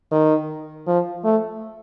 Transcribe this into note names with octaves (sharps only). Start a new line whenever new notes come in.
D#3
F3
A3